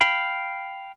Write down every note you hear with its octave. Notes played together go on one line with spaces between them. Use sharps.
F5 G5 B5